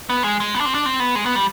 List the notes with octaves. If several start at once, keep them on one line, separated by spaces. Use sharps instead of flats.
B3
G#3
G#3
B3
D4
C4
D4
C4
B3
G#3
B3
G3